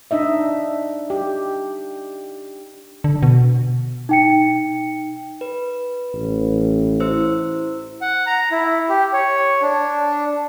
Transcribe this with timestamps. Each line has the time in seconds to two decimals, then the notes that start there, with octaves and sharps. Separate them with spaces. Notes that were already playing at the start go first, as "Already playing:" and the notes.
0.11 D4 D#4 D#5 E5
1.10 G4
3.04 D3
3.23 B2
4.09 D#4 G5 C#7
5.41 B4
6.14 A1
7.00 E4 C5 E6
8.02 F#5
8.27 A#5
8.51 E4
8.89 G4
9.13 C#5
9.62 D4